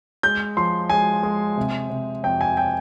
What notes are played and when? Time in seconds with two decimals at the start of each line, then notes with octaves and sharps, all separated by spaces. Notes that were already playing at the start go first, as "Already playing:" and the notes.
0.23 G#3 G6
0.57 F3 C6
0.90 G#3 G#5
1.23 G#3
1.57 C3
1.90 C3
2.23 F2 G5
2.41 G#5
2.57 G5